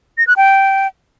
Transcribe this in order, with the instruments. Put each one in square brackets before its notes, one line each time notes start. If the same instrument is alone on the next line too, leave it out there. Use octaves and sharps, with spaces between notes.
[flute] A#6
F#6
G5